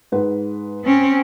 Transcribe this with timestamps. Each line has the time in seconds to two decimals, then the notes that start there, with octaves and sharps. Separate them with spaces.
0.12 G#2 B4 F#5
0.84 C4 C#4